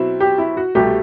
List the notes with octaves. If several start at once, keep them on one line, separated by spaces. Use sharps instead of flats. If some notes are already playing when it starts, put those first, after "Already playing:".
Already playing: B2 F#3 C4 E4
G4
E4
F#4
C2 B2 A3 G4